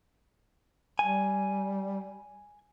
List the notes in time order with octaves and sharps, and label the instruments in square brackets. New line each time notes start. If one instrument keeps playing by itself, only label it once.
[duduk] G3 [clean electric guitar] G#5